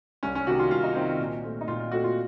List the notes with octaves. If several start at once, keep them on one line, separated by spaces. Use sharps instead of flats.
C2 C#4
C#4
C3 D#3 A#3 F#4
F4
C2 F4
D#4
C3 D#3 A#3 C4
A#2
A3 C4
D#4
A#2 F4
F4
A3 C4 F#4
F4